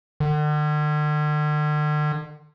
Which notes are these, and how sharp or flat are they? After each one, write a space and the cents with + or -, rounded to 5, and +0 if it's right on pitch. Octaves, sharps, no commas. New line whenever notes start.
D3 +45